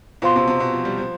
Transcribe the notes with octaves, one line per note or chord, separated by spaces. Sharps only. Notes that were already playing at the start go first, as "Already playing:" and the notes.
B2 F4 C5 F5 C6
C3
C3
B2
F3
G3
F3